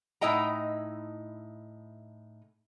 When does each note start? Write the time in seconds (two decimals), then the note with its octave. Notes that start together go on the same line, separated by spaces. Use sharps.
0.21 A2 D#4 E4 D#5 G5 A#5